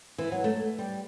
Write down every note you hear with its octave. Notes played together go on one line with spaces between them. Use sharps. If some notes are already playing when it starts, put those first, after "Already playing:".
E3
F#3
A3
G3